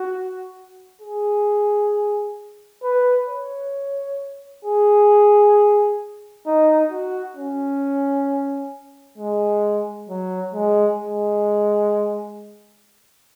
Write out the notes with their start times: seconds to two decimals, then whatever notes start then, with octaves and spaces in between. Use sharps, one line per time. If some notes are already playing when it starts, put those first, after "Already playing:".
Already playing: F#4
1.01 G#4
2.83 B4
3.28 C#5
4.64 G#4
6.46 D#4
6.91 F#4
7.36 C#4
9.18 G#3
10.09 F#3
10.54 G#3
11.00 G#3